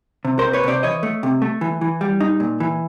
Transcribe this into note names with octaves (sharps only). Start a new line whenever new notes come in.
C3
C3 A#4 C5
B4 C#5
C3 C5 D5
E3 C#5 D#5
A3
C3
A3
E3
E3
G3
D#4
A#2
E3